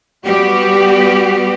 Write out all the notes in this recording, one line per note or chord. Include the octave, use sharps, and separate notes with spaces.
G3 B3 F#4 G4